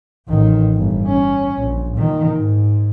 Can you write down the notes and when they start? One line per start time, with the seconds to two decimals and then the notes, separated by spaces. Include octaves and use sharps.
0.28 A1 D#3
0.74 G1
1.06 C#4
1.57 A#1
1.98 A#2 D#3
2.36 G#2